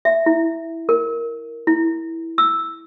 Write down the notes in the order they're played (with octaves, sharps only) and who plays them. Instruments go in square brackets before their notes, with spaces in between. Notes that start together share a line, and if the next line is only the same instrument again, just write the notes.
[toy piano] E5
E4
A#4
E4
E6